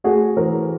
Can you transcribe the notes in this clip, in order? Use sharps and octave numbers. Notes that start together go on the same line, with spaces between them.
A3 F#4 G#4
E3 A#4 C5